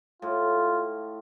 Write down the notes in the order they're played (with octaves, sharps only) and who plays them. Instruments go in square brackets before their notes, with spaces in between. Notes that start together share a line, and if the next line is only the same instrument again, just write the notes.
[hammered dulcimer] A2 [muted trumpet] F4